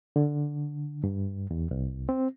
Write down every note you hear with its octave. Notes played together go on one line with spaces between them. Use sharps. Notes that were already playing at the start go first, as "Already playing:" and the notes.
D3
G2
E2
C2
C4